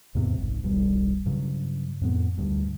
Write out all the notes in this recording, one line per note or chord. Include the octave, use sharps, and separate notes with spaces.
E2 G#2 C3 B3
G1 C2 G#2
D#1 B1 G2 G3
G2 C#3 F#3
F2 A2 A#3 B3
D2 G2